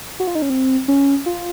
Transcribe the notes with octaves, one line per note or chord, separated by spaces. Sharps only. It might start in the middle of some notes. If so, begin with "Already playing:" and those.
F#4
F4
D#4
C#4
C4
C#4
F4